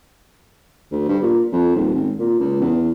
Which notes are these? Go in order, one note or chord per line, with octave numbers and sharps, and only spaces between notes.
D2
G2
A#2
F2
D#1
G#1
A#2
C#2
E2